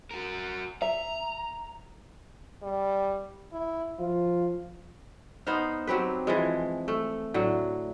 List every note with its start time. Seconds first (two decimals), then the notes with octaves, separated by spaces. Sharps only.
0.11 F#4 A#4
0.82 E5 A#5
2.63 G3
3.53 E4
3.99 F3 F4
5.47 B3 D#4 C5 F5
5.87 F#3 C4 G4 B4
6.27 E3 F3 G#3
6.88 A3
7.34 A2 D3 F#3